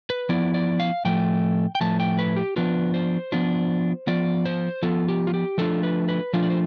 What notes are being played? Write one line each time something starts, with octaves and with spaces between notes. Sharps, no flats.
B4
F3 B3 E4 D5
D5
F5
A2 F3 A3 G5
G5
A2 F3 A3 A5
G5
B4
G4
F3 B3 D4 F4 B4
C5
F3 B3 D4 F4
F3 B3 F4 D5
C5
F3 B3 F4 A4
G4
F4
G4
F3 A3 D4 F4 A4
B4
B4
F3 A3 D4 F4 C5
D5
C5